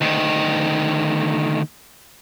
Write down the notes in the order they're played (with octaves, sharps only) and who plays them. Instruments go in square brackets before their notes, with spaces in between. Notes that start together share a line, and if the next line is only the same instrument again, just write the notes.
[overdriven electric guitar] D2 D#3